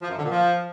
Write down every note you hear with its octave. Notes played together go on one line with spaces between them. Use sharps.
F3
F#2
D3
A#2
F3